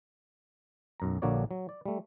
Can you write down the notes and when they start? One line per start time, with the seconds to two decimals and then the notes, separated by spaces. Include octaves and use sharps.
1.00 B1 F#2 A#5
1.22 A#1 D3 A#3 F#4 C#5 D5
1.51 F#3
1.69 D5
1.86 G3 A3